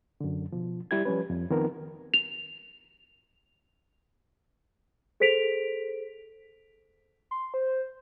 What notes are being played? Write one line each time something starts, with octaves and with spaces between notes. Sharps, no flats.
F#2 D3
B2 F3
G3 E4 G4 G#6
F3 G3 C#4 B4
F2
D#3 F3 B3 C4 D#4 A#4
F7
G#4 A4 C5 B6 D7 F7
C6
C5